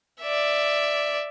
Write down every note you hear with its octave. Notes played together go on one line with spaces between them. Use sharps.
D5 E5